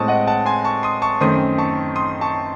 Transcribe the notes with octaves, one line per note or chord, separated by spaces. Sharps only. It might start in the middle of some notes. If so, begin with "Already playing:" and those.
Already playing: A2 G#3 C4 A5 C#6 D#6
D#5 F#5
F#5 A5
G#5 C6
A5 C#6
C6 D#6
A5 C#6
F#2 D#3 A3 C4 C6 D#6
A5 C#6
C6 D#6
A5 C#6